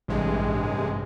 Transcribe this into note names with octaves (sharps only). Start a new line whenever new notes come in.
A1 G2 C3 G#3